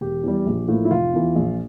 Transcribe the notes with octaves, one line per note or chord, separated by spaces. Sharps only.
E1 G4
E2 E3 G3
A#1
A2 F3 A#3
E4
F1 F4
E2 E3
A#1